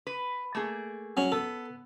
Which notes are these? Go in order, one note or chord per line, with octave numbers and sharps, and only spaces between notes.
B4
A3 A#3 G#4
F#3 C#4
B3 A4